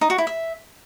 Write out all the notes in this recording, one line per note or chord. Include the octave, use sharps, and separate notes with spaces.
D#4
F#4
E4
E5